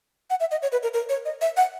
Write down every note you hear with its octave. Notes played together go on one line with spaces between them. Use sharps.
F#5
E5
D#5
C#5
B4
A#4
A#4
C#5
D#5
E5
F#5